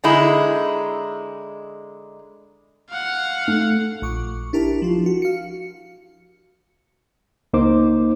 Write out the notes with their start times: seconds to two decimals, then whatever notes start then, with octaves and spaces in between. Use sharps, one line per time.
0.04 D3 G#3 D#4 E4
2.90 F5 F#5
3.48 A3
4.02 A#1 C#6 D6
4.53 D4 E4 G4 A#4 A5
4.82 F3 F4
5.06 F#4
5.22 F5 C#7
7.53 C#2 A#3 D#4 C5 D6